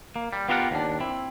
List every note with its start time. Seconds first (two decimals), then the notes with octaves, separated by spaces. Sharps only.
0.16 A#3
0.33 G3
0.48 B3 F4 G4 A#4 E5 F#5
0.71 D#2 D4
1.00 C4 E4